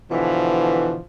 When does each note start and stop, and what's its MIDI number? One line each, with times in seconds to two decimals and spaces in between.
0.11 1.00 47
0.11 1.00 50
0.11 1.00 52
0.11 1.03 53